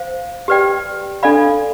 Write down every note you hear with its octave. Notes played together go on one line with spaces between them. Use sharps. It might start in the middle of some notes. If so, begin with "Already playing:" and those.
Already playing: C5 F5
G4 B4 D5 G5
D4 A4 D5 F5 B5